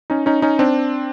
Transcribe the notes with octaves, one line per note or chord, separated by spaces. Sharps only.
C#4 D#4
C#4 D#4
C#4 D#4
C4 D4